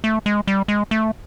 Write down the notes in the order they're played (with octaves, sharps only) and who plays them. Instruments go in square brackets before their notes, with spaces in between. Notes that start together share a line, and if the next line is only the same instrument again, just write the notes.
[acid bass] A3
G#3
G3
G#3
A3